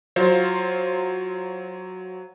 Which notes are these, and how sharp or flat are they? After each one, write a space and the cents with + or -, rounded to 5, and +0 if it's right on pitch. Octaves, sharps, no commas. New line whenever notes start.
F#3 +0 F4 +0 C5 +15